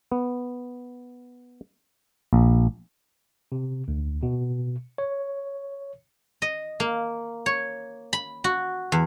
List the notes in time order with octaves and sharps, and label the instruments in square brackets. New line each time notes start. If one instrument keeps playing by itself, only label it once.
[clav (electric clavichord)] B3
A#1
[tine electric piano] C3
D2
B2
C#5
[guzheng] D#5
A#3
C#5
B5
F#4
E2